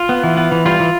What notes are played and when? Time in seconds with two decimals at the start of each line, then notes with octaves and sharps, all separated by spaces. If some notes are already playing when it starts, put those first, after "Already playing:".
Already playing: F4
0.09 B3
0.23 E3
0.37 B3
0.52 E3
0.66 G3 F4
0.80 E3